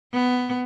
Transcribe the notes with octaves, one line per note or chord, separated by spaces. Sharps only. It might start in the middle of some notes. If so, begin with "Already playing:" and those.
B3